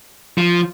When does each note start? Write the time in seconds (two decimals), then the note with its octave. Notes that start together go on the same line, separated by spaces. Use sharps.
0.38 F3